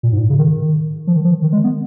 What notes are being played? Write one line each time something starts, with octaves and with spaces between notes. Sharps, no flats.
A#2
G#2
C#3
D#3
F3
D#3
F3
D#3
G#3
B3